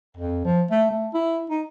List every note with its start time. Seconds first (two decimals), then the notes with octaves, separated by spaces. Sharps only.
0.17 F2
0.45 F3
0.71 A3
0.91 A3
1.14 E4
1.50 D#4